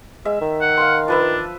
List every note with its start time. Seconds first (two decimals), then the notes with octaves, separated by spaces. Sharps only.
0.25 G#3 E5
0.41 D#3
0.61 F#5
0.77 F5 C6
1.08 F3 D4 B4 E5